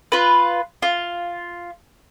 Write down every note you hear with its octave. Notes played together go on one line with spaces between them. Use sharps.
F4 B4
F4